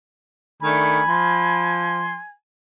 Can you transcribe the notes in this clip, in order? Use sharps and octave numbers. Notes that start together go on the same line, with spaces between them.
D#3 A3 D4 G#5 B5
F3 C6